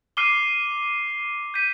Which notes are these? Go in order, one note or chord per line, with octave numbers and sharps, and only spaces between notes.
D6 F6 C7 D#7 G7
G6 B6 D#7